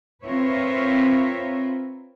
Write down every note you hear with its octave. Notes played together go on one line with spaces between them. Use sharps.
C4 F4 A#4 B4 C#5 E5